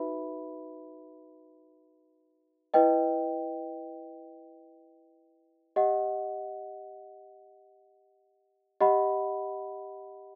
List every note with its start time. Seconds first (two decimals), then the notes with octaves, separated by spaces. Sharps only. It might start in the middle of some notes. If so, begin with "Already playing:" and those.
Already playing: D#4 F#4 B4 E5 B5
2.74 E4 B4 D#5 G5
5.76 G4 D#5 F#5
8.81 G4 D#5 F#5 B5